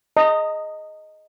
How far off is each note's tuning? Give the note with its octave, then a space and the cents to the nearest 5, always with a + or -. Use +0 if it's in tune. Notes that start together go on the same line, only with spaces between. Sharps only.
D#5 +0 A#5 -35